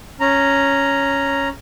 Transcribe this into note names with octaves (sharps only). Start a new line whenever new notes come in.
C#4 A#5